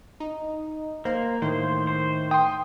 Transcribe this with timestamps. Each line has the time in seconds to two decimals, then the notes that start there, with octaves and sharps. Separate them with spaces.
0.20 D#4
1.05 A#3 C5
1.42 A2 D#3 C5
1.87 C5
2.31 G5 C6 D#6